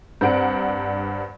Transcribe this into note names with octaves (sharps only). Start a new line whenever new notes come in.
G2 C4 D4 F#5 A#5 D7